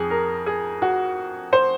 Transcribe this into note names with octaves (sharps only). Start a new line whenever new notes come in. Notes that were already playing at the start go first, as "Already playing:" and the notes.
Already playing: F2 G#4
A#4
G#4
F#4
C5